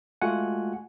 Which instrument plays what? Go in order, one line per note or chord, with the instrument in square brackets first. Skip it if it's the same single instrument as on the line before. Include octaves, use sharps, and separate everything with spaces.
[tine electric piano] G#3 A3 F4 F#4 F#5 G#5